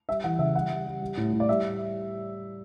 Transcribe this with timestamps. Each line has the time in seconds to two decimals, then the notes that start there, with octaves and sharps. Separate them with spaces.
0.08 G3 E5
0.24 E3 F#5
0.39 C#3 E5
0.55 G3 F#5
0.71 G3
0.87 G3
1.01 G3
1.17 A2
1.33 A2
1.40 D5
1.49 G3 E5